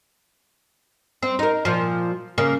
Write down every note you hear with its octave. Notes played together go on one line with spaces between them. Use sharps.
C4
D#4 A#4
A#2 F3
C#3 A#3